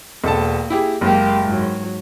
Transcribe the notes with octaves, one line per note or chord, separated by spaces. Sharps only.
E1 A#3 A4 A5
E4 G4 G#4
F#1 G#3 A#3 G4
G#2 F#3